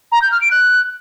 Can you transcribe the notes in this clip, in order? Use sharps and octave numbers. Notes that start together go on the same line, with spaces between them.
A#5
G6
F6
D7
F#6